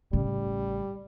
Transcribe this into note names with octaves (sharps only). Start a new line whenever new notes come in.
A1 C#3 G3